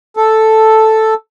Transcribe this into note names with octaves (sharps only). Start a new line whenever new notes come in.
A4